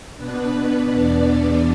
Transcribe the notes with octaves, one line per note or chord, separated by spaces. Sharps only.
B2 B3 D4 B4
B4
E2 B2 B3 D4 D5